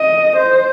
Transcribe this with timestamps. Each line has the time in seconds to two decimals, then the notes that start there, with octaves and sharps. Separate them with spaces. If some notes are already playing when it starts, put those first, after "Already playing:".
Already playing: D#5
0.36 C5